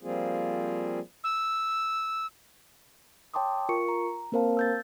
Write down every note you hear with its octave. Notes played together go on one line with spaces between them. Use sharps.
F3 G3 A#3 C4 F4 G#4
E6
C#5 G5 A5 C6 D6 D#6
F4 A#4 C#6 C#7
A#5
A#3 C4 A#4 C5 F5 A5
E6 G6 A6